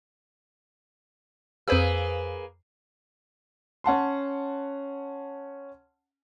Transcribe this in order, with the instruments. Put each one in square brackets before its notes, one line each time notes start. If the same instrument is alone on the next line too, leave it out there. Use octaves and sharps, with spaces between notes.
[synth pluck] F2 C5 E6 [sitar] A#3 G#4 B4
[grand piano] C#4 F#5 A5 C6